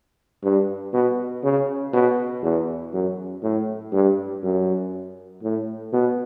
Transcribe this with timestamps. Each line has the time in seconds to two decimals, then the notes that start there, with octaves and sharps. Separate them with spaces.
0.43 G2
0.93 B2
1.43 C#3
1.93 B2
2.43 E2
2.93 F#2
3.43 A2
3.93 G2
4.43 F#2
5.43 A2
5.93 B2